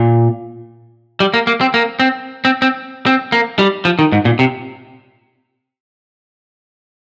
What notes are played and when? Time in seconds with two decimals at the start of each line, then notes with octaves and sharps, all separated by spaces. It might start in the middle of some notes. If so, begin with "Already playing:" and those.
Already playing: A#2
1.20 G3
1.34 A#3
1.47 A#3
1.61 C4
1.74 A#3
2.00 C4
2.45 C4
2.62 C4
3.06 C4
3.32 A#3
3.59 G3
3.85 F3
3.99 D#3
4.12 G#2
4.25 A#2
4.39 C3